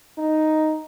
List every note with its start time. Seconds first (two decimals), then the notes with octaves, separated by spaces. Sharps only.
0.18 D#4